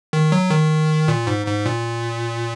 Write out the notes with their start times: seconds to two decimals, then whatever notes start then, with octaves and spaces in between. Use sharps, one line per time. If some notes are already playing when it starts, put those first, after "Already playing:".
0.13 D#3
0.32 F#3
0.50 D#3
1.08 A#2
1.27 G#2
1.46 G#2
1.66 A#2